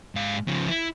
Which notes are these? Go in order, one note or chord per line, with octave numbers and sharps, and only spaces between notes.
G#2 F5
C#3 F3
E4